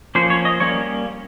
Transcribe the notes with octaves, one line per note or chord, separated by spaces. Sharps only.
F3 A#3 C#4 C5
C#5
D#5
G3 A#3 C#4 C#5